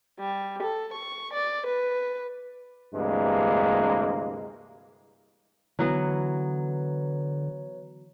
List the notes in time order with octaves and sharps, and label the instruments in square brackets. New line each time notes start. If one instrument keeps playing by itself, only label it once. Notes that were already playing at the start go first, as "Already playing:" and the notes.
[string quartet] G3
A4
C#6
D5
B4
[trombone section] D2 G2 C3 E3 G#3 A#3
[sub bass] D3 [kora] E3 F#3 B3 [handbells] B4 C#5 A#5